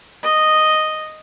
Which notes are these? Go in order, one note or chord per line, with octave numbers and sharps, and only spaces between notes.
D#5